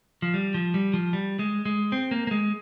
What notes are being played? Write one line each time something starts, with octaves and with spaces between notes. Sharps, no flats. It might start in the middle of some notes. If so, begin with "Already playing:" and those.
F3
G3
F3
G3
F3
G3
G#3
G#3
C4
A#3
A#3
G#3